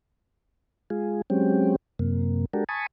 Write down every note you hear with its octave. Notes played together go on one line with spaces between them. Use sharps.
G#3 F4 G#4
F#3 G#3 C4 C#4 G4
F#2 C3 A#3
G#3 D4 F#4 G4 A4 A#4
G#5 A5 B5 C#6 D#6